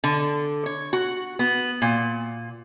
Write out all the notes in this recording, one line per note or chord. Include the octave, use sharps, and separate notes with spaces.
D3
C#5
F#4
B3
A#2